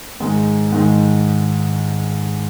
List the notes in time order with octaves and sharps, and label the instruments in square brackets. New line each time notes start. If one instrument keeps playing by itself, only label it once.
[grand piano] G#2 D#3 G#3
G#2 D#3 G#3